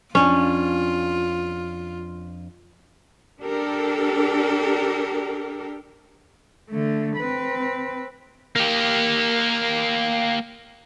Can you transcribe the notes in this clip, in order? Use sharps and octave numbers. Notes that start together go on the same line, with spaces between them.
F2 C#4 D4 F4
D4 G4 A4 A#4
D3 A3
C4 B4
A#3 G4